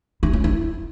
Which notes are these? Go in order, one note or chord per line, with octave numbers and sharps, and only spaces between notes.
E4
C#4
E4